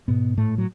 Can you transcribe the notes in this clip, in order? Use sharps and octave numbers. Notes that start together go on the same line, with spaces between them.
G#2 B2 B3
A2 A3
F#3